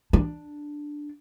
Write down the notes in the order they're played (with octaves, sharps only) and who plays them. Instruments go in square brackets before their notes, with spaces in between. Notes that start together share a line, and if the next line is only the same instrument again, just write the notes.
[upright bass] D4